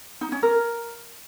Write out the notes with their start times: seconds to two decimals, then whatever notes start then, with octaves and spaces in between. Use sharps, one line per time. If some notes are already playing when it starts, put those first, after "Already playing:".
0.21 D#4
0.32 C#4
0.43 A#4